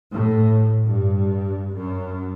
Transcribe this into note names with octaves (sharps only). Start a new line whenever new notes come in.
A2
G2
F#2